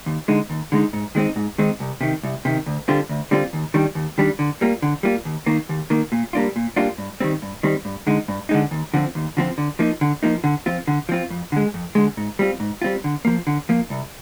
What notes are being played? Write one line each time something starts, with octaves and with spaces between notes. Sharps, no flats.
D#2
D3 G#3 D#4
D#2
D3 G#3 D#4
G#2
D#3 G#3 C4 D#4
G#2
D#3 G#3 C4 D#4
C2
C3 D#3
C2
C3 D#3
D2
D3 G3 C4 F4
D2
D3 G3 C4 F4
D#2
D#3 G3 D4
D#2
D#3 G3 D4
D3
G3 A#3 F4
D3
G3 A#3 F4
D#2
D#3 A#3
D#2
D#3 A#3
A#2
G3 A#3 D4 F4
A#2
G3 A#3 D4 F4
G2
D#3 G3 C4
G2
D#3 G3 C4
G2
D3 G#3 D#4
G2
D3 G#3 D#4
D#2
D3 F3 C4
D#2
D3 F3 C4
D3
F3 A#3 D#4
D3
F3 A#3 D#4
D3
F3 C4 F4
D3
F3 C4 F4
F2
D3 G#3
F2
D3 G#3
G#2
G3 C4 F4
G#2
G3 C4 F4
D3
F3 A#3
D3
F3 A#3
C2